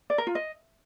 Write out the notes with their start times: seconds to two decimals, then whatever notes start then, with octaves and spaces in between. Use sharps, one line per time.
0.10 D5
0.18 A#4
0.27 F4
0.35 D#5